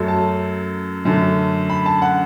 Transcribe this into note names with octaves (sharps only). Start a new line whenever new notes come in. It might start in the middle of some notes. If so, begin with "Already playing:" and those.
Already playing: F#2 F#3 A3
A5
F#2 D3 A3
B5
A5
F#5